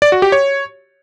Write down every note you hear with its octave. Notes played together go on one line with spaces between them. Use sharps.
D5
F#4
G4
C#5